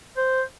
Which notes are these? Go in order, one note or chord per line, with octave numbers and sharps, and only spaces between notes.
C5